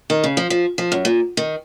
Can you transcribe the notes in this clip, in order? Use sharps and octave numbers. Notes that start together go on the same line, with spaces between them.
D#3
C#3
F3
F3
F3
F#2
A#2
D#3